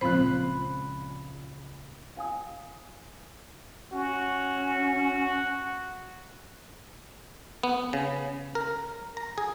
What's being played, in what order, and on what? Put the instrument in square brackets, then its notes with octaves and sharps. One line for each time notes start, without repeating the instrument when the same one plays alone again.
[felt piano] C#2 A#2 [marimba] F3 C4 C5 [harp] B5 F#6
[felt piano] F5 G#5 D#6
[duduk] C#4 [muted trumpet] F#4
[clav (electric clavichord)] B3
C#3
A#4
A#5
G#4